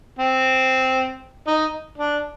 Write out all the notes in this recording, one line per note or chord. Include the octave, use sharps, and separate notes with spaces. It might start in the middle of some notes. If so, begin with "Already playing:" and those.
C4
D#4
D4